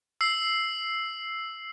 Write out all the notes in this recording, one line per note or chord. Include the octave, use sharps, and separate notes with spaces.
E6 C7